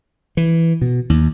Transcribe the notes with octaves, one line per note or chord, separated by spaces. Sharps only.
E3
B2
D#2